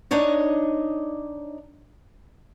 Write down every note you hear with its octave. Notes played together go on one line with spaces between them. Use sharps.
D4 D#4 C#5 D#5